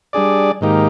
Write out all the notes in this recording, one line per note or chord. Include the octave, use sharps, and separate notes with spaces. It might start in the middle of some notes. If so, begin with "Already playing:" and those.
G3 D4 G#4 D5
G#2 D#3 A#3 D#4 G4